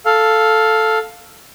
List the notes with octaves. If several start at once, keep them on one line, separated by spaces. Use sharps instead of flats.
A4 F5